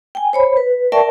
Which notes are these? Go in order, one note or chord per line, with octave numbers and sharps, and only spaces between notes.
G5 G#5
C5 C#5 B5
B4
A#4 D5 E5 G5 A5 C#6